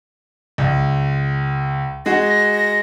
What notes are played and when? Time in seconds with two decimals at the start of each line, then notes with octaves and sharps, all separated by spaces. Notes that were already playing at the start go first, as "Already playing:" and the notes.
0.58 C#2
2.06 G#3 F#4 A#6
2.22 A#6